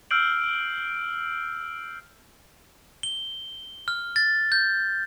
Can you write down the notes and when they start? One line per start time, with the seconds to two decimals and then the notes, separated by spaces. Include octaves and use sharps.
0.11 E6 F6 G6 C7 D7 F#7
3.03 G7
3.88 F6
4.16 A6
4.52 G6